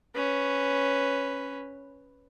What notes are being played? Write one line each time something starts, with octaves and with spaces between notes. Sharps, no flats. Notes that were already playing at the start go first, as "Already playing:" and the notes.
C#4 B4